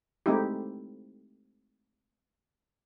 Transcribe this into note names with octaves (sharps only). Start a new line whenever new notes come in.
G#3 A3 C4 D#4 E4 G4